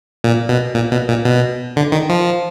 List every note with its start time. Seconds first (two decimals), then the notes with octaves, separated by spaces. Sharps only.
0.24 A#2
0.49 B2
0.74 A#2
0.92 B2
1.08 A#2
1.25 B2
1.76 D3
1.92 D#3
2.10 F3